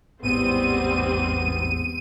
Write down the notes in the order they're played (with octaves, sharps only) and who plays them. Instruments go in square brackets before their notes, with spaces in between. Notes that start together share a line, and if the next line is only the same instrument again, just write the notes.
[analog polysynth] A1 E2 G#2 [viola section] G3 C4 [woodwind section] B3 [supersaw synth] D#7